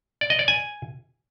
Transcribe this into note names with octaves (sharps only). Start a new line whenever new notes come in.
D5
D#5
D5
G#5